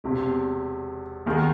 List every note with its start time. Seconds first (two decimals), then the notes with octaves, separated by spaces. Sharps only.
0.04 E1 E2 C3
1.26 D#2 D#3 G#3 D#4 F#4